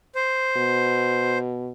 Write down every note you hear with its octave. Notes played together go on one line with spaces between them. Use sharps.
C5
B2